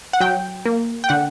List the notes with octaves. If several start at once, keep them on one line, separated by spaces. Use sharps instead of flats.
F#5
F#3 G5
A#3
G5
D3 F#5